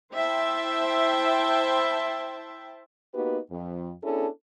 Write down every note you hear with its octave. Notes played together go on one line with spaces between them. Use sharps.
E4 C5 E5 G5 A5
A#3 B3 D#4 F#4 G4 B4
F2
B3 C#4 D4 E4 G#4 A4